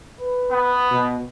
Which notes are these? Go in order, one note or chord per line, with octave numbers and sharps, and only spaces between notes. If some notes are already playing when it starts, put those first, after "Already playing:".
B4
B3
B2